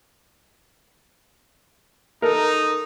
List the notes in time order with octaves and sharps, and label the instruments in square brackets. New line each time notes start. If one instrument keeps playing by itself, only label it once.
[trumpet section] D#4 [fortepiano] A4 A#4